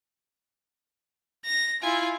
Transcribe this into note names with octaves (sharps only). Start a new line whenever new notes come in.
A#6
E4 F4 G#5